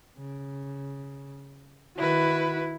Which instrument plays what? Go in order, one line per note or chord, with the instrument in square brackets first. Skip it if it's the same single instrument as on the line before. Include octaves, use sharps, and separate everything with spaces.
[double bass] C#3
[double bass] D#3 [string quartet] E4 [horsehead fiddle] F#4 B4